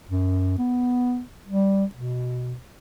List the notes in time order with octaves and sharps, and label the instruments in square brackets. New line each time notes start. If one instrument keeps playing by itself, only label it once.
[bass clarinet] F#2
B3
G3
B2